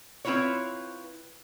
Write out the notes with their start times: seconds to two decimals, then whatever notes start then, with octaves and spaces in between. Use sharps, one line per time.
0.25 C4 E4 F4 B4 C#5